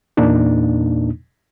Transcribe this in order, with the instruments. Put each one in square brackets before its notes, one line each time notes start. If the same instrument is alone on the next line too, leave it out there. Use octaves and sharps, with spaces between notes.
[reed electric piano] E2 A#2 A#3 D4 D#4